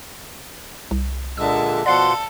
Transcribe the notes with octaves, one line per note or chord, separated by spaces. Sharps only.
C2
A#2 D3 G#3 E5 A5 E6
B2 F3 A4 D5 F5 F#5 C6